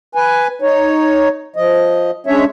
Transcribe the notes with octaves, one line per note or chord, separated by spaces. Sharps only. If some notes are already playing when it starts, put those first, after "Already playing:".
B4 G#5
D#4 C#5
F3 D#5
G#3 C#4 D4 C#5 E5